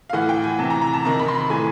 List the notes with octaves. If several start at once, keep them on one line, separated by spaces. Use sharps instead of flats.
F5
A2 E3 F#5
G5
G#5
C3 E3 A5
A#5
A#5
A5
C3 D#3 A#5
B5
C6
B5
A2 E3 G#5